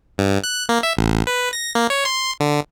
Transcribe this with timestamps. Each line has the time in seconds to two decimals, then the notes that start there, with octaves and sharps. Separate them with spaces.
0.18 G2
0.44 F#6
0.69 A#3
0.83 E5
0.97 A1
1.27 B4
1.53 A#6
1.75 A#3
1.90 C#5
2.05 C6
2.40 D3